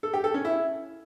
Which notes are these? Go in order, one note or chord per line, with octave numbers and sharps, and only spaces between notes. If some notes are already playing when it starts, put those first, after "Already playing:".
A4
G4
A4
C#4
E4